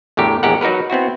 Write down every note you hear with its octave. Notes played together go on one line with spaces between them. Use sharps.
E2 A2 D3 G4 A#4
A#1 E2 G#3 G4 A#4 F#5
F#3 D#4 F#4 A#4 B4
B3 C4 E4 F#4